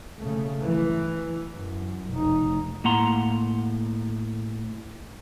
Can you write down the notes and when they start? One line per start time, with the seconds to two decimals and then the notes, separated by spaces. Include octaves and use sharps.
0.18 C#3 A3
0.63 E3
1.54 F#2
2.10 F1 D#4
2.84 A2 A#3 F#5 A#5 C6